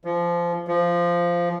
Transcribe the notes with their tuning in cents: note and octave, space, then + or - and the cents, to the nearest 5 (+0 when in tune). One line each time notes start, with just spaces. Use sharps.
F3 -20
F3 -10